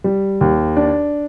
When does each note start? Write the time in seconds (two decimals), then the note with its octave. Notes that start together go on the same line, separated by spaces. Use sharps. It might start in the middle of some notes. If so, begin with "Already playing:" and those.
0.04 G3
0.41 D#2
0.77 D4